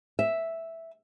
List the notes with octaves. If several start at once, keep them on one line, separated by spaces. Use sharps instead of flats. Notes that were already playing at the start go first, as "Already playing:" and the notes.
E5